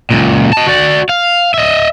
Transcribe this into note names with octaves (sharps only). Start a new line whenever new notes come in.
C#2 A#2
D#5 A5
F#4 D5
F5
D#5 E5